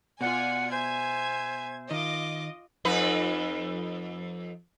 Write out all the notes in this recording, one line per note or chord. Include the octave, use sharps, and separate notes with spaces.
B2 F4 D5 F#5 G#5
C5 E5 G#5 G#6
D#3 F4 D#5 D6
F2 D#4 B4